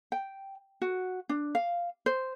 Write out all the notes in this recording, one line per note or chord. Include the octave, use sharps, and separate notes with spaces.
G5
F#4
D4
F5
C5